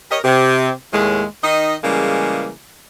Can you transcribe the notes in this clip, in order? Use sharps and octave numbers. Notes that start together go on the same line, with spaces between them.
G4 A#4 C#5 D#5
C3
D#2 A2 G#3
D#3 D#4 D#5
C#3 E3 G3 G#3 A#3